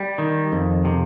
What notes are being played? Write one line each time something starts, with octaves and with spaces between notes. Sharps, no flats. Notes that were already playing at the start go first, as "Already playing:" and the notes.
Already playing: G3
D#3
F2
C3